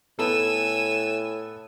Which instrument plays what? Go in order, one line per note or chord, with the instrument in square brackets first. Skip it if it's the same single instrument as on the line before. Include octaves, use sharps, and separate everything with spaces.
[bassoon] A2 [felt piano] B3 A4 [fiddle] G#5 E6